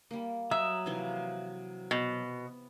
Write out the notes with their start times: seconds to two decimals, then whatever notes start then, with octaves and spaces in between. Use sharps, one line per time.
0.11 G3 A#3
0.51 F#3 E5 A#5 D#6
0.86 C3 E3 F3
1.91 B2